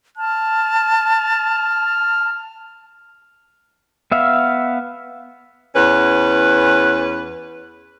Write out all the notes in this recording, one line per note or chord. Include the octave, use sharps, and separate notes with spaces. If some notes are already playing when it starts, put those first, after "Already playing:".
A5 F6
B3 E5 F5
E2 C#4 B4